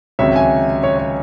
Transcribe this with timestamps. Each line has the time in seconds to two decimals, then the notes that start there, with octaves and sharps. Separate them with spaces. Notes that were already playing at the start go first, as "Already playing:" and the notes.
0.19 C#2 C3 D#3 F#3 C#5 E5
0.36 E5 G#5
0.83 C#5
0.99 C#5